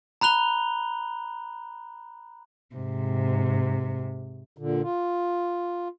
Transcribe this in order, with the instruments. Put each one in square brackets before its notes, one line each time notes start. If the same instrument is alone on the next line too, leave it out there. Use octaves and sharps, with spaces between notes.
[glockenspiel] A#5 B5 F#6 F7 G7
[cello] G#2 C3
[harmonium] A#2 D3
F4